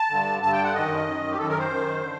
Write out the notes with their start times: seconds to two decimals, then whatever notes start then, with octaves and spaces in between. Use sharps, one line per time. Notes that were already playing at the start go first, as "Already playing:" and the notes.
Already playing: A5
0.10 G2 D3
0.42 G2 D3 A5
0.53 G5
0.64 F#5
0.74 F#2 D#3 D#5
1.06 F#2 D#3
1.31 G4
1.38 F#2 D#3 A4
1.49 A#4
1.58 C5
1.69 F#2 D#3
2.02 D3